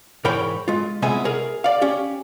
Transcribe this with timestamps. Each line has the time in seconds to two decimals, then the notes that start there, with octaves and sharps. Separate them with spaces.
0.25 G#2 E3 A#4 C#5 G5 B5
0.68 G#3 F4
1.02 C2 C3 G#3 B3 E5 G#5
1.25 G#4 A#4
1.64 D5 F5
1.81 C#4 G4